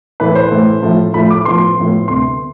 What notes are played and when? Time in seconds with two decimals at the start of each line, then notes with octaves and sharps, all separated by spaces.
0.20 A2 E3 A3 B4
0.35 C5
0.51 A2 E3 A3
0.82 A2 F3 A3
1.14 A2 F3 A3 B5
1.30 D6
1.45 A2 F3 B3 C6
1.77 A2 F3 B3
2.08 D2 C3 G3 B3 C6